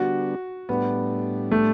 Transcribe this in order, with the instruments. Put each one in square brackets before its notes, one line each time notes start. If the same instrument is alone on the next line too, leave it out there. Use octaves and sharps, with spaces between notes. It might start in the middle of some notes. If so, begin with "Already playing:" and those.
Already playing: [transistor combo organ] D3 G3 B3 D4 [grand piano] F#4
[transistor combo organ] A2 G3 D4 [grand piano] B3
[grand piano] A3